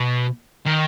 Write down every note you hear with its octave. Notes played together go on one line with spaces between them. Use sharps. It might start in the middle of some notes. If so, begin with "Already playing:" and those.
Already playing: B2
D#3